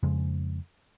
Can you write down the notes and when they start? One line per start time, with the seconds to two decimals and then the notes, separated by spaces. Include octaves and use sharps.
0.03 F2 C#3 G#3